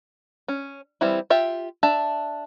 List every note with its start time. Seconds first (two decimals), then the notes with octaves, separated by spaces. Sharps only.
0.48 C#4
1.01 E3 G3 C4 E4
1.30 F4 G4 E5 G5
1.83 D4 E5 A5